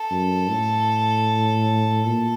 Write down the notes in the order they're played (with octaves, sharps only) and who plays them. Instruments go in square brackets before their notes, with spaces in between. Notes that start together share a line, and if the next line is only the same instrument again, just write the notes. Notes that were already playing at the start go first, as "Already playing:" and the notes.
Already playing: [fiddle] A4
[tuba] F#2
A2
[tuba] A#2 [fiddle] A4